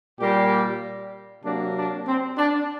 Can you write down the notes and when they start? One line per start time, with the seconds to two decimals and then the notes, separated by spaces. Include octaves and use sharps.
0.19 A#2 G3 A#3 G4
1.44 C3 F#3 A#3 D4
1.76 D4
2.07 C4
2.38 D4